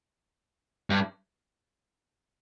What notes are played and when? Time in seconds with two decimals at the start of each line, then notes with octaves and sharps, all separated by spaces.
0.90 G2